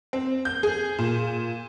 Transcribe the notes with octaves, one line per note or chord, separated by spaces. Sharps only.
C4
G6
G#4
A#2